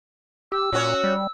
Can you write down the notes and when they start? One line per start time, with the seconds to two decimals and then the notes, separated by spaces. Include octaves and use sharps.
0.52 G4 E6
0.72 A#2 C#4 F#4 C#5
1.04 G3